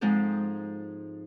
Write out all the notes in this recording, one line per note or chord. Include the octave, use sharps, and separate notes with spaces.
G#2 F3 G#3 C4 D#4 A4